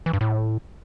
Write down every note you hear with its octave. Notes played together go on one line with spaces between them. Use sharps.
E3
G2
A2